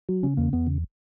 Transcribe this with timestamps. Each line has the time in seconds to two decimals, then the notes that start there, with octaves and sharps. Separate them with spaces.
0.09 F#3
0.23 C#3 C#4
0.37 E2 A#3
0.53 E2 B3
0.67 C#3